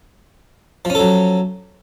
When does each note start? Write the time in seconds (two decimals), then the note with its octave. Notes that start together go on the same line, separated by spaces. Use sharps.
0.85 F3
0.90 C#4
0.95 A4
1.00 F#3